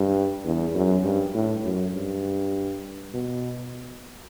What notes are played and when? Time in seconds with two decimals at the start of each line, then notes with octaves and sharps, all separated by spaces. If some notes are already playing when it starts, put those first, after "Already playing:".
Already playing: G2
0.45 E2
0.75 F#2
1.04 G2
1.34 A2
1.64 F#2
1.94 G2
3.14 B2